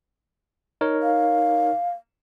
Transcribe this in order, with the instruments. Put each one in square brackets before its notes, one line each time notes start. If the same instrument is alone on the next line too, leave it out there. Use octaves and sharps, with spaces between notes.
[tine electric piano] D#4 A#4 C#5
[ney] F5